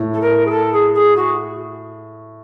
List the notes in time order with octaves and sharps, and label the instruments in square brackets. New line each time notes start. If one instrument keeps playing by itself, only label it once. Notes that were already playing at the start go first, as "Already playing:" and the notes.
Already playing: [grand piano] A2
[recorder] A4
A#4
G#4
A4
G#4
G#4
F#4